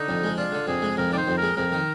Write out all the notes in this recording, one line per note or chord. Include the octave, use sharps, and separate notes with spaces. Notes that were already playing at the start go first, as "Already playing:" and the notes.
Already playing: D3 D#4
F2
G#3
D4 F4
D3
F2 G#4
G#3
F2 A#4
D#3 D5
C5
F2
G#3 A#4
F2 A#4
D#3